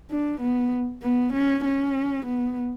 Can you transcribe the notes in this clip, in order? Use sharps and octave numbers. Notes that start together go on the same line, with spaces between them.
D4
B3
B3
C#4
C#4
B3